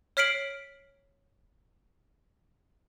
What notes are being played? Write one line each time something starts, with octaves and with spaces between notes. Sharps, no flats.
C#5 F6 B6 C7 D7 F#7